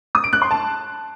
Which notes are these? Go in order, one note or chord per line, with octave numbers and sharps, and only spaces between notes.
D#6
D7
F#6
C6
A5